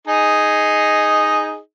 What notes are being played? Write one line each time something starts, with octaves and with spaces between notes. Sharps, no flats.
D#4 G#4 D#5